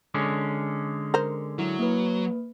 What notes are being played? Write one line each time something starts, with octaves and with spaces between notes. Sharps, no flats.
D3 G#3 C#4
A#4 C5
F#3 E4
A#3 B4